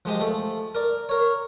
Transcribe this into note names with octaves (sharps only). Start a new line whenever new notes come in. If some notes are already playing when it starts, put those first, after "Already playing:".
F3 G#3 G4 D#5
F3 A3
A#4 D5
A#4 C#5